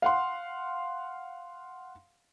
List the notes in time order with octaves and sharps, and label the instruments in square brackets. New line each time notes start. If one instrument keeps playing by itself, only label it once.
[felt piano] F5 F#5 C6